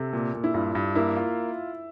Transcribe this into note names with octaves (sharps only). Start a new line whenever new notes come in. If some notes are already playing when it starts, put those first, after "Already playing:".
Already playing: C3 A4
A#2
A#2
E4
G2 F4
G2
A#3 E4
F4